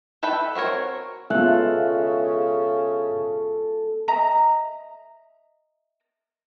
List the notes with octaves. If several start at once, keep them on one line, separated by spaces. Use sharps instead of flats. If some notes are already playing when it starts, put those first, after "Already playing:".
A4 B4 E5 G5 B5
C4 F#4 A#4 C#5
C#3 G#3 B3 F4 A4 E5 F#6
D#5 E5 A#5